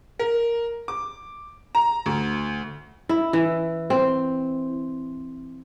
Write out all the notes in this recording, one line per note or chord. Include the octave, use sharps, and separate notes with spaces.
A#4
D6
A#5
D2
E4
E3
C4